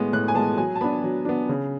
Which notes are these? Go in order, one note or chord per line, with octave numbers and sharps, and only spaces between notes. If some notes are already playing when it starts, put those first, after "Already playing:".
Already playing: A2 G#3 B3
A2 F#6
G#5
G#3 B3 A5
F#3 G#5
A5
B3 D4 B5
F#3
B3 D4
C#3